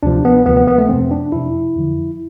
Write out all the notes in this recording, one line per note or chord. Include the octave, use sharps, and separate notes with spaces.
D2 C3 F3 D4
B3
D2 C3 F3 B3
B3
B3
A3
F2 C3 F3 C4
D4
F2 C3 F3 E4
F2 D3 F3